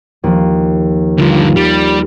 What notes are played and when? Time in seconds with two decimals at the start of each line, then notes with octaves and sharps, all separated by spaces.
0.24 D#2 F3
1.18 G2 D3 D#4 F4
1.56 G3